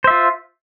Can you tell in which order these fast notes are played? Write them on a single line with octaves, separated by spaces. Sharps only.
C5 E5 F4